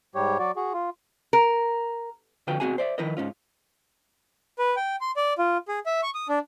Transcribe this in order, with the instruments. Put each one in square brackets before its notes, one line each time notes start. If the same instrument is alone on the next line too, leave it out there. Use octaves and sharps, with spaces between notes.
[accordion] G#2 G3 G4 C#5
F#3 F#4 D5
F#4 G#4
F4
[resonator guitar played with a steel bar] A#4
[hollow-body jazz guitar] F2 D3 F4 F#4 B4 G5
B2 C4 F#4 G#4 G#5
C5 D5 E5
D#3 F3 E4 A#4 B4 D#5
G#2 C#4 F4
[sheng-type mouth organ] B4
G5
C6
D5
F4
G#4
E5
C#6
D#6
D4